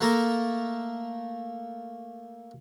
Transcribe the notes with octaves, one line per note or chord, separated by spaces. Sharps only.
A3 A#3 A4 A#4